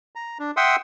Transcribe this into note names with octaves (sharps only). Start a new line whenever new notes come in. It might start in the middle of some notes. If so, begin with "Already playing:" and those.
A#5
D4
E5 F#5 G5 C6 D#6 E6